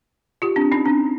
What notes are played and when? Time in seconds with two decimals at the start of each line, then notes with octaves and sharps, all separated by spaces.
0.42 F4 G4
0.56 C4 D4
0.72 C#4 D#4
0.86 C4 D4